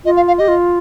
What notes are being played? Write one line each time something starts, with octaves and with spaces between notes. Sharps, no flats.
F4 D#5
F5
F5
G4 D#5
F4